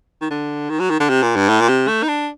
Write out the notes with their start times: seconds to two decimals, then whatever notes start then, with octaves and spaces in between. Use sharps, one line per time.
0.21 D#3
0.31 D3
0.70 D#3
0.80 F#3
0.90 D#3
1.00 D3
1.09 C3
1.22 A#2
1.36 G2
1.49 A2
1.61 A#2
1.69 C3
1.88 A3
2.03 D#4
2.08 D4